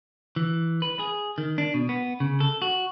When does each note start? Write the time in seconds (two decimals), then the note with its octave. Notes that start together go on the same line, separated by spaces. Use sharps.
0.36 E3
0.82 B4
0.99 G#4
1.38 D#3
1.58 D4
1.74 B2
1.89 B3
2.20 C#3
2.40 A4
2.62 F#4